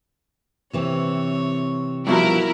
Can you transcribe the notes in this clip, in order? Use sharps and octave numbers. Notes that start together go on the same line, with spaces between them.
C3 E3 C4 C#5
G2 B2 F3 E4 F#4 A#4